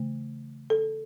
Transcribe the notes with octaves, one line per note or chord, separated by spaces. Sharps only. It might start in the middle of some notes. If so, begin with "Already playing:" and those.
Already playing: C#3 E3 A3
A4